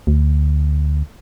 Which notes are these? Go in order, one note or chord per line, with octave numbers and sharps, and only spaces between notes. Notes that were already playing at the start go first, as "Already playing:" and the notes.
D2